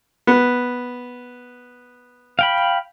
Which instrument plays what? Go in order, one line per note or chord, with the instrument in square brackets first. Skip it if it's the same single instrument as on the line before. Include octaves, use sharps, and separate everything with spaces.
[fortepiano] B3
[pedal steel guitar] F5 G5 B5